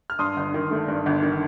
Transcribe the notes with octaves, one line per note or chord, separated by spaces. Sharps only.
F6
G2 C6 D#6
G1
D#3
A3
G2
G1
D#3